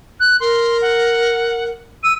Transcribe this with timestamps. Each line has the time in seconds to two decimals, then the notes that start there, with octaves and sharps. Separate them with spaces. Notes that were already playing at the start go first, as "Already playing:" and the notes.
0.20 F#6
0.40 A#4 C6
0.81 F#5
2.03 E6 D#7